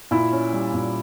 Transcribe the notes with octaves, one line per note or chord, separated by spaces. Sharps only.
A#2 E4
C#4
G3
A#2